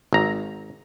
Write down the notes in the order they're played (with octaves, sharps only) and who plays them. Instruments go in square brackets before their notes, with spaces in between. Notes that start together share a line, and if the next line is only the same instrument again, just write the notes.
[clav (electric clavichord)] G#1 A#5